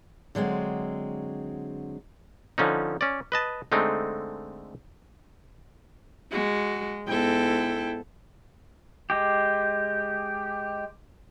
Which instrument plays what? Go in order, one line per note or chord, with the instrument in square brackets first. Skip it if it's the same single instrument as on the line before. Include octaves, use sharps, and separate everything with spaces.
[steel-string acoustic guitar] D3 F#3 G#3 C4
[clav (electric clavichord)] D3 F3 C#4 D#4
C#4 D5
B4 D#5 A5
D3 G#3 A3 C4 D#4
[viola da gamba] G#3 [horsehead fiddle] F#4
[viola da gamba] G#2 B3 A4 [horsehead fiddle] E4 G5
[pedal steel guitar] G#3 G4